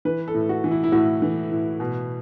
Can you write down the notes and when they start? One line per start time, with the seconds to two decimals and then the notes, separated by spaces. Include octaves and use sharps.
0.05 E3 B4
0.28 A4
0.34 A2
0.49 F#4
0.64 E3
0.71 E4
0.83 E4
0.92 A2 F#4
1.22 E3
1.52 A2
1.80 B2